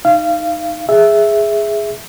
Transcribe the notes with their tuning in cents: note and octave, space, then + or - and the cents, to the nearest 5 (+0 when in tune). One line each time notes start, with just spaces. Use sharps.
D#4 +0 F5 -25
G#4 +0 E5 +0